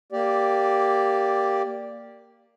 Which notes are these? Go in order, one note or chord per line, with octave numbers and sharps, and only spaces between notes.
A#3 G4 D5